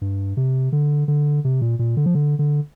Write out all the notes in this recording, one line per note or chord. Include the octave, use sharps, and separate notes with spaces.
G2
C3
D3
D3
C3
A#2
A#2
D3
F3
D3
D3